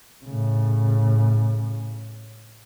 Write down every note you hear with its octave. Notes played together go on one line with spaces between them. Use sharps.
A2 C#3